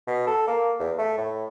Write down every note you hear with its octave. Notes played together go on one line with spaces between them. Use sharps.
B2
A4
A#3
E2
A3
A2